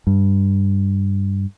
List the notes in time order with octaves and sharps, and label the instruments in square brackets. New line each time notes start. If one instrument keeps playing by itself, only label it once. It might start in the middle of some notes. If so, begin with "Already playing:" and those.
[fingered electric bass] G2